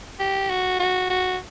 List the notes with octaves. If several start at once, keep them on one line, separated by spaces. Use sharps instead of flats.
G4
F#4
F#4
F#4